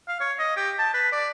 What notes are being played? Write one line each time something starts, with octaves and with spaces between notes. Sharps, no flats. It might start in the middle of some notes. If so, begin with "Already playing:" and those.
F5
C#5
D#5
G4
A5
B4
D5